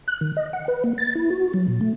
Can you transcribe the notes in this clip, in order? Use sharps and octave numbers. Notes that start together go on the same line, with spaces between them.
F#6
D#3
D#5
F#5
B4
A#3
A6
E4
F#4
F#3
A#2
A3